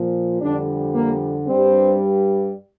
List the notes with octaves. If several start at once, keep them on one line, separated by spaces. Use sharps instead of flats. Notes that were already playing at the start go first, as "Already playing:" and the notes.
Already playing: A#2 F3
F2 D3 G3 D4
A#3
G2 G3 C4